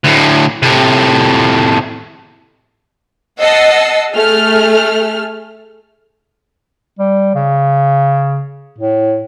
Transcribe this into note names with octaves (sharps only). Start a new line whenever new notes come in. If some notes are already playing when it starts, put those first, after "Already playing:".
D2 A2
A2 C3
D#5 F#5 A5 E6 C7
A3 G#4 F6
G3
C#3
A2